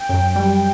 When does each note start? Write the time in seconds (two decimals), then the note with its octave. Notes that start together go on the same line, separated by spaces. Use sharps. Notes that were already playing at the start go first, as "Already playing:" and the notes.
Already playing: G5
0.09 F#2
0.36 G3